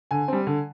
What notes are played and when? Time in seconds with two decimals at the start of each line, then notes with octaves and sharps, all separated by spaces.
0.11 D3 G#5
0.28 G3 C4
0.47 D3